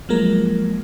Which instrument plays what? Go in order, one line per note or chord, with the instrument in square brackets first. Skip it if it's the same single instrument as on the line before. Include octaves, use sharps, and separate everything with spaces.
[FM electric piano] F3 F#3 G#3 A#3 A#4